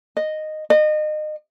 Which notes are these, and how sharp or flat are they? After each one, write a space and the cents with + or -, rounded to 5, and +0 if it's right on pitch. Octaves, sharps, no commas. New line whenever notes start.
D#5 -10
D#5 -30